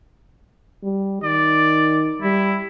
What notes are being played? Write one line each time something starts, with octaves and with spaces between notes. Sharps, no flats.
G3
D#3 D5
G3 E4